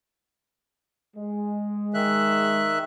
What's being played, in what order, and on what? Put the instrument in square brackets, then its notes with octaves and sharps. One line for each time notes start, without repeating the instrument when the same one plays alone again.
[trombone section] G#3
[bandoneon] D#3 E5 F#6